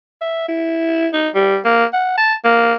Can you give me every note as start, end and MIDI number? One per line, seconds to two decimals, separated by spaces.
0.21 0.47 76
0.48 1.07 64
1.13 1.29 63
1.34 1.57 55
1.65 1.84 58
1.93 2.13 78
2.17 2.34 81
2.44 2.75 58